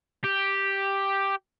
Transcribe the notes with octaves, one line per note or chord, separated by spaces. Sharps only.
G4